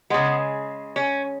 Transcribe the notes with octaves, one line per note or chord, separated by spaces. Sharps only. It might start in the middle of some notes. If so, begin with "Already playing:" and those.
C#3 G#3 B3
C#4